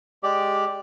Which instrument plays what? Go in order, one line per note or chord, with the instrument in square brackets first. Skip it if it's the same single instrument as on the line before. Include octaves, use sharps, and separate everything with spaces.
[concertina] G#3 G4 D5